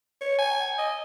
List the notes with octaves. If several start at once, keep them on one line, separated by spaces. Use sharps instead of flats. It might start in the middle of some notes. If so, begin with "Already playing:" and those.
C#5
G#5
D#5